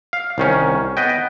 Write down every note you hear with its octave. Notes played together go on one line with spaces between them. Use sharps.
F5
C2 D#3 C#4
B3 B4 D#5 G5